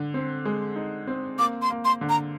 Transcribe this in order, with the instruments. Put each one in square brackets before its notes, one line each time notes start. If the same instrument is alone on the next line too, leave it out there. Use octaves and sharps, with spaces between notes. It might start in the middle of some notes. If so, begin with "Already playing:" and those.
Already playing: [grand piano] D3
C4
G#3
D#4
C4
[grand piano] A#3 [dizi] D6
[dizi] C6
[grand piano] A#3
[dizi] C6
[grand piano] D3
[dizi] A#5